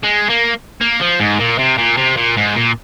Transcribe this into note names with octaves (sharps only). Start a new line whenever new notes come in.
G#3
A#3
A#3
F3
G#2
A#2
C3
A#2
C3
A#2
G#2
A#2